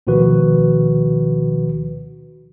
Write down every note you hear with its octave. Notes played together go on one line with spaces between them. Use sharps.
D2 B2 D#3 F3 F#4 B4